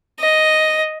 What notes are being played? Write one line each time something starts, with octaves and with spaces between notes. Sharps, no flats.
D#5